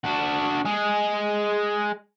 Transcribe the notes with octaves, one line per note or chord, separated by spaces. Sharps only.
D4 F#4
G#3 G#4